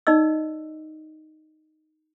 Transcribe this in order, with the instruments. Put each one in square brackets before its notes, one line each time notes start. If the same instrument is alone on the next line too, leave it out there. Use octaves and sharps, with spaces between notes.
[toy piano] D#4 D5 D#5 E6